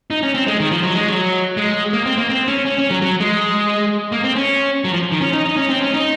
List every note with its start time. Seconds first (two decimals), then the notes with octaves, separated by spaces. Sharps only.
0.10 D#4
0.23 C#4
0.35 C4
0.47 G#3
0.60 D#3
0.72 F3
0.83 F#3
0.95 G#3
1.08 F#3
1.57 G#3
1.93 A#3
2.06 C4
2.18 A#3
2.29 C4
2.48 C#4
2.65 C#4
2.79 C#4
2.91 F#3
3.02 F#3
3.20 G#3
4.12 A#3
4.23 C4
4.36 C#4
4.85 F#3
4.93 F3
5.12 D#3
5.21 C#4
5.33 D#4
5.46 D#4
5.57 C#4
5.70 C4
5.81 C#4
5.94 D#4